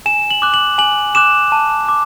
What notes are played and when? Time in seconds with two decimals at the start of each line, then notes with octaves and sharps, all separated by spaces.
0.06 G#5 E7
0.31 F#7
0.42 D6 F#6
0.54 F#7
0.78 G#5 F#7
1.15 D6 F#6 E7
1.52 A5
1.89 D6